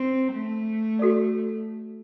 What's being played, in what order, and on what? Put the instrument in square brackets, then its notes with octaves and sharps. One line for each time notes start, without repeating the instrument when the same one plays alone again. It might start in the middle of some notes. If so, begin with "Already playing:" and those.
Already playing: [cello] C4
A3
[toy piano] F#4 A4 D5